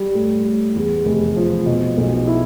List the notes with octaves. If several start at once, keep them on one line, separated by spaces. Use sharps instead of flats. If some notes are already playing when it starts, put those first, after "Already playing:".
Already playing: G3
A2
A2
E2
F1
F3
B2
B1
E4